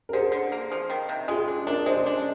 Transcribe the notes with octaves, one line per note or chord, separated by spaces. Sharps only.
A#4
D3 G#4 C5
D3
A#3
F3
D#3
C3
G#3 F4 G#4
D4
D4 A#4 D5
G#3 C5 D#5
D4